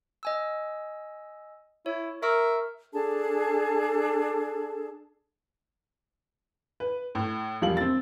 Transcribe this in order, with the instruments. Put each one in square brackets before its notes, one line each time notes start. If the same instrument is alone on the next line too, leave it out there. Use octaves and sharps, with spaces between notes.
[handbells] D#5 G#5 E6
[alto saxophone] E4 [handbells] C#5
[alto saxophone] A#4 [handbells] E5 C#6 E6
[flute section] D4 G#4 A4 A5
[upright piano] B4
A2
E1 F3 G3 F4 F#7
C4 A6